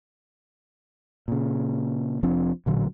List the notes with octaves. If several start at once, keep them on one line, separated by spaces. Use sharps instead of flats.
A#2 C#3
F1 F3 C4 D4
A1 A#2 D3 F#3